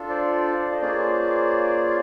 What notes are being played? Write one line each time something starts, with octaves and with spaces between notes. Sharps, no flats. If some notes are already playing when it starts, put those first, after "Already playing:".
Already playing: D4 F4 A4
C5 D5
D#5
A#3 C#4 F4 G#4 C5 D5